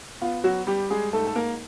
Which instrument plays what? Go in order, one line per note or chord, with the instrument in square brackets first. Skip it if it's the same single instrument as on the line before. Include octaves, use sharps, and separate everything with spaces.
[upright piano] B3 F4
F#3 F#4
G3 G4
G#3 G#4
G#2 A3 A4
A4
A#3 A#4